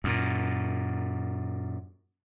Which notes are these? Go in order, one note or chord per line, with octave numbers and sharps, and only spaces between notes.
F#2 A#2